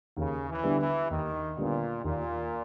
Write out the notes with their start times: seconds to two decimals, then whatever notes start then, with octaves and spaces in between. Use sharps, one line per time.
0.17 D#2 C#3
0.48 E3
0.63 D3 G3 B3
0.79 E3
1.10 D#2 D#3
1.57 A#2 D3 G3 B3
2.04 D#2 A#2